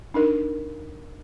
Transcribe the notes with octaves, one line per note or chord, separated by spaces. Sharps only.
D4 D#4 A#4